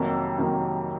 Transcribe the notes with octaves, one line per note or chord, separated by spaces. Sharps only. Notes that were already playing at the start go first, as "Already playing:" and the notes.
Already playing: F2 C3 D#3 F#3 A#3
F2 C3 D#3 F#3 A#3